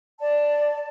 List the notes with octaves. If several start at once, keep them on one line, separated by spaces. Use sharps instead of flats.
D5 A5